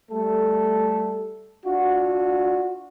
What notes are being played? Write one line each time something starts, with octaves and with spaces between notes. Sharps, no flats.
G3 A3 A4
D4 F4 F#4